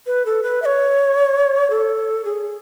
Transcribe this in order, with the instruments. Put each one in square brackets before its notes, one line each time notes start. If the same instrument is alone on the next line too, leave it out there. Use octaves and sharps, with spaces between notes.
[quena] B4
A4
B4
E5
C#5
A4
G#4